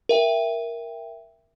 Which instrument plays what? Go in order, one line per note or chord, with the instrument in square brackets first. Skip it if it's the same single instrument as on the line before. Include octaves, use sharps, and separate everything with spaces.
[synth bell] A#4 E5 G5